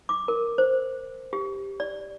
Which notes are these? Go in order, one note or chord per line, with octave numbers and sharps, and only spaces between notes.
D6
A#4
C5
G4
D5